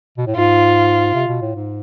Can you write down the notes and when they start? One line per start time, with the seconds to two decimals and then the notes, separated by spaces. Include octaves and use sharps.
0.18 B2
0.27 A2
0.36 G#2 F4
1.14 C3
1.28 B2
1.41 A2
1.55 G#2